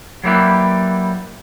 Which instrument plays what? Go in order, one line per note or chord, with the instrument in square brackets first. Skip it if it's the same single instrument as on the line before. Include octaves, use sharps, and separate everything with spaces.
[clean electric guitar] F#3 G3 A#3 E4 G4 B4